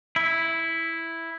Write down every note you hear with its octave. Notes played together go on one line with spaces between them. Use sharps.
E4